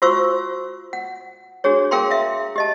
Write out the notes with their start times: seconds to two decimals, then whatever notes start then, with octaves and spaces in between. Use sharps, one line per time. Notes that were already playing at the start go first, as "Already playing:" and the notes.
0.02 F4 F#4 C5 F5 C#6 E6
0.93 F#5
1.64 D4 F#4 G#4 C#5
1.91 G#4 A#4 F5 G5 A#5 C6
2.11 E5 F5
2.56 G4 D#5 A5